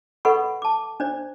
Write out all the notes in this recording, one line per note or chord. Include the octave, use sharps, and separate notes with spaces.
A4 B4 D#5 F#5 B5 C#6
A5 D6
D4 C5 D5